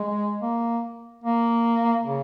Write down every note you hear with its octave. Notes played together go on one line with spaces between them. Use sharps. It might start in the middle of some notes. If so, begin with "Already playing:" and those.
Already playing: G#3
A#3
A#3
C#3